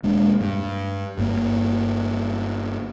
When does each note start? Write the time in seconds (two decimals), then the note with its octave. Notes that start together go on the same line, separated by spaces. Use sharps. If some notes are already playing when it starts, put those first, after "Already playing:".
0.03 E1 G#3 A#3 D4
0.41 G2
1.17 G1 G2 C3 A#3